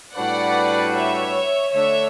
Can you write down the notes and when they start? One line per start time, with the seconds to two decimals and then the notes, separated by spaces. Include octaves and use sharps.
0.15 A2 G3 D4 F#4 B4 D5 F#5
0.94 C#5 E5
1.73 D3 A3 D4 C#5 E5